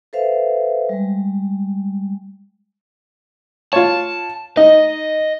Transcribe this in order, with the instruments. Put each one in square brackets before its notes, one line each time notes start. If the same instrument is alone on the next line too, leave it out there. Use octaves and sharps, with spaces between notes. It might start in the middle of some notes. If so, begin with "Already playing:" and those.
[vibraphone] A4 B4 C5 E5 F5
G3 G#3
[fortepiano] F4 C#5 [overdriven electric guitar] A5
[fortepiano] D#4 [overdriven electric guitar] D#5